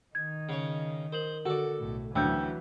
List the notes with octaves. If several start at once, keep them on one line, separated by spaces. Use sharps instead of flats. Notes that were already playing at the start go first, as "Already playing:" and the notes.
D#3 D#4 G#6
C#3 C#5
A#4 C5 F#7
D3 F#4 A4 D5
B1 A2
D2 E3 F#3 C#4 G5 E6 G6